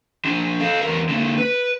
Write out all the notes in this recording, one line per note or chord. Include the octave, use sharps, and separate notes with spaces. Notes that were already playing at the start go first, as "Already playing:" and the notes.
F3 D4
A4 F5
E2 A#4
D3 A#3
B4